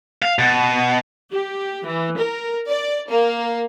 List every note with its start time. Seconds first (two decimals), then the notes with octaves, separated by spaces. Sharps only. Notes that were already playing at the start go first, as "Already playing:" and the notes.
0.22 F5
0.39 B2
1.32 G4
1.84 E3
2.17 A#4
2.68 D5
3.09 A#3